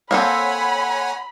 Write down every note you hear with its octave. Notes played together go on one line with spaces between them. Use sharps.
A#3 C4 A4 C#5 F#5 G#5 B5